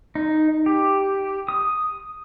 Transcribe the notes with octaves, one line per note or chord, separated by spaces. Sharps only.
D#4
G4
D#6